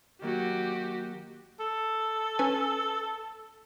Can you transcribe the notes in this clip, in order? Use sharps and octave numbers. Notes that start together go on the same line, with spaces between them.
D#3 F#3 A#3 F#4 G4
A4
C#4 B4 G#5